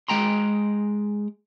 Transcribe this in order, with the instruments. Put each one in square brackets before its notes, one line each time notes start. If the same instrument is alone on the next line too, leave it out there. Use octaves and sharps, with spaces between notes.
[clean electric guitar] G#3 G5 A#5 C6